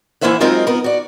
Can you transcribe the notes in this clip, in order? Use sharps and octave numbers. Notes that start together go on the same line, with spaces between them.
E3 G#3 A#3 C5 E5 F#5
F#3 G#3 C4 D#4 F4 A#4
B3 A#4
F#4 D5